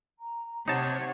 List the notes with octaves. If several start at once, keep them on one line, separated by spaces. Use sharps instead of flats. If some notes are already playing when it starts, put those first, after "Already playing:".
A#5
C3 D#4 C#5 F#5 A5